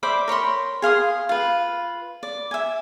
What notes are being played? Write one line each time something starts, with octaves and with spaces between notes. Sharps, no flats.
C5 D5 E5 B5
A#4 C#5 B5 C6
G#4 F5 C6 D#6
F4 B4
D5
E5 G#5